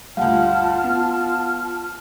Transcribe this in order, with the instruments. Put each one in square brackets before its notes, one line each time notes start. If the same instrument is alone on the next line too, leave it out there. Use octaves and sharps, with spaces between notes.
[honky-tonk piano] D2 G2 [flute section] F4 A5 F6 [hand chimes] F5 F#5
[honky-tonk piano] B3